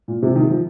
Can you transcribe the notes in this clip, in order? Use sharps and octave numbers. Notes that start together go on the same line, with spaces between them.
A#2
C3
D#3
F3